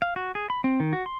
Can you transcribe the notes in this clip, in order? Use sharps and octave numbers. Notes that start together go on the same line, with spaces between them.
F5
F#4
G#4
B5
C4
D#3
F#4
C6